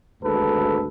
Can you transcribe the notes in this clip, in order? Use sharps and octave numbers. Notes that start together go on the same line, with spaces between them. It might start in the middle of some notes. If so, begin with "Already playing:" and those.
G#1 D2 G#2 A4 B4